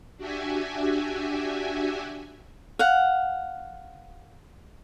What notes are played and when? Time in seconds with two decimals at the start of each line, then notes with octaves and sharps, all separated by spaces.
0.17 D4 F#4 G4 E5 G#5
2.79 F5 F#5